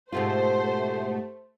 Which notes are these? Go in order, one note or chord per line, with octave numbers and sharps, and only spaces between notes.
G#2 B2 A3 F4 G4 C5 F#5 A5